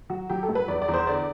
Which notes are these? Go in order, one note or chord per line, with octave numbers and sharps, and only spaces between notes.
F#3 F#4
F#3 G4
A4
G2
B4
E2 D5
D5
E2
C5
D3 D5